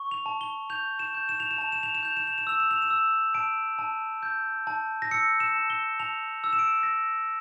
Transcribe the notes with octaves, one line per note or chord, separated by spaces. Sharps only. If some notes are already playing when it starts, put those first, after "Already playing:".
Already playing: C#6
F7
A5
G7
G6 F7
E7
G6
E7
F7
E7
A5 F7
E7
F7
E7
G6 F7
E7
F7
E7
E6 F7
E7
F7
E7
E6
A5 D7
A5
G6
A5
A#6
E6 C#7
E7
A5
G7
A5 F7
E6
E7
D7
A#6